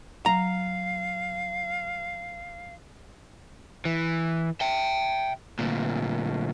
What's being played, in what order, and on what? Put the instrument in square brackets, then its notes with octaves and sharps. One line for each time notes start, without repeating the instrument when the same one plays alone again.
[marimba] F#3 [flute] F5 [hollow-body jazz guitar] A#5
[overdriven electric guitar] E3
E5 G5
D2 A#2